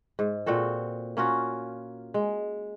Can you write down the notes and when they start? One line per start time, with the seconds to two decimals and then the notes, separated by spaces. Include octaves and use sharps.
0.19 G#2
0.46 A#2 C4 F#4 A4
1.17 A#3 C#4 F4 F#4
2.14 G#3